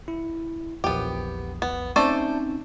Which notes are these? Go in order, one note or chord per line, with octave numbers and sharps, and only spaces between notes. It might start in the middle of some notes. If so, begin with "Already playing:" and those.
E4
A#1 E2 B3 G4
B3
A3 C4 C#4 D#4 C5 D5